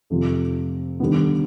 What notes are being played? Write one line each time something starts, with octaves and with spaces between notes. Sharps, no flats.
F1 F2 C3 F3
D#2 D3 G3 B3